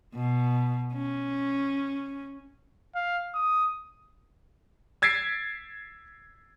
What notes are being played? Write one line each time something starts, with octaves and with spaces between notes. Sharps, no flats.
B2
C#4
F5
D#6
E6 G#6 A6 B6 C7 D7